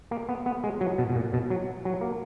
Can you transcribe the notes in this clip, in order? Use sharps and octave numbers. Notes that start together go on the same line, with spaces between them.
A#3
B3
B3
G#3
F#3
B2
B2
A#2
B2
F#3
F#3
A#3